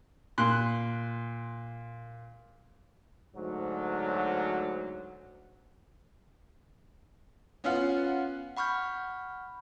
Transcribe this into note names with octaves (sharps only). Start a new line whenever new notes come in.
A#2 C6 F#6
D2 G#2 F#3
B3 C#4 F4 F5 F#5
F#5 B5 C#6 F6 G6